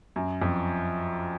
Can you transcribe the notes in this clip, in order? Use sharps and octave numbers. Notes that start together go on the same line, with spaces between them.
F#2
F2